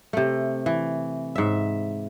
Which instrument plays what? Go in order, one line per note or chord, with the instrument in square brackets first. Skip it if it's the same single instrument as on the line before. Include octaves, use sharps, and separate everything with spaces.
[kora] C3 A3
E3
G#2 E5